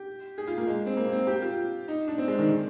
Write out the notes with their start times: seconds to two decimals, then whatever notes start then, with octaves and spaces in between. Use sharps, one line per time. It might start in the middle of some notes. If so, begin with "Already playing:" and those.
Already playing: G4
0.38 G#4
0.47 F4
0.58 A#3
0.67 G#3
0.86 C4
0.97 A#3
1.12 C4
1.27 G4
1.42 F4
1.88 D#4
2.08 D4
2.18 C4
2.28 G#3
2.38 D#3
2.48 D3